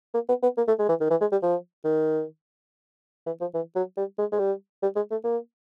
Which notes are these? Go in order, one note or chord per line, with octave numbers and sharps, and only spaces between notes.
A#3
B3
B3
A#3
A3
G#3
E3
D#3
E3
G#3
G3
F3
D#3
E3
F3
E3
F#3
G3
G#3
G#3
G3
G3
G#3
A3
A#3